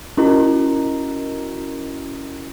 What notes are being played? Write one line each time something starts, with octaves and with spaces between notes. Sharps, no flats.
C#4 E4 F#4 A#4 D#5 A#5